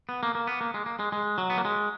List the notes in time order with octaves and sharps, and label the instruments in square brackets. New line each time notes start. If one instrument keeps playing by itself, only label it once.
[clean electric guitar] B3
A#3
A#3
B3
A#3
G#3
A#3
G#3
G#3
F#3
B3
A#3
G#3